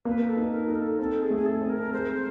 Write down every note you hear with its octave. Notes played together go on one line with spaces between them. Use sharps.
A#3 B4
A4
D#4
A#4
D#4
A4
C4 A4
G#4
A3
G#4
A4
C4
A#4
G#3 C5